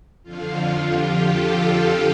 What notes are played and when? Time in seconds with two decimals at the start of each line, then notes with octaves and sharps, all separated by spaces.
0.23 F2 D3 F3 F4
0.92 G4
1.26 A4
1.62 G4